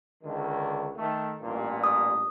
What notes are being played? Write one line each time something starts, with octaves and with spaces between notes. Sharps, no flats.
C#2 D3 D#3
D#3 A3
A1 G2 A#2
D#6